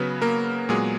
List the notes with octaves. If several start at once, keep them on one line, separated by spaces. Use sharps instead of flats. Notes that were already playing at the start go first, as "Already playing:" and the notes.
Already playing: C#3 F#3 B3 B4
A#3 A#4
A#2 F#3 G#3 B3 G#4